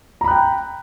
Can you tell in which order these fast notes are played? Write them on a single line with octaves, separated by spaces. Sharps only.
A#5 B5 F#6 G5